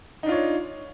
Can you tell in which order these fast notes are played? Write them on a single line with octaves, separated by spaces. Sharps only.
D#4 D4 F4 C#5